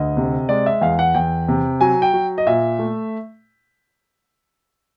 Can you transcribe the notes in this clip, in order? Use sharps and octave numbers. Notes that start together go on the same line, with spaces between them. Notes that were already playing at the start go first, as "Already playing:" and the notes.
Already playing: D2 D#5
C3
G#3 D5
E5
E2 F5
F#5
E2 G5
C3
F#3 G#5
G5
F#3
D#5
A#2 E5
A3